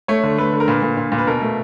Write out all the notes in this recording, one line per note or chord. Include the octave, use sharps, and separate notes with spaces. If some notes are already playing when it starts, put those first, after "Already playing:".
A3 C#5
D3
A3 B4
D3
A#4
A#2 B4
A#2
A#2
A#2
B4
B2 A#4
A3